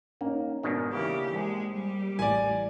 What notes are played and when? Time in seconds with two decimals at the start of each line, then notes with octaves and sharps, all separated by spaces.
0.21 A#3 C#4 D#4
0.63 G#2 B2 D#3 D4
0.93 C#3 E3 A#3 G4
1.35 A#1 G#3
1.74 G3 G4
2.19 A1 D5 G#5